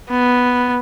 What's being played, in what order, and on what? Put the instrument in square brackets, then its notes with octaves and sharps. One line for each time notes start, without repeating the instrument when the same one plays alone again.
[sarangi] B3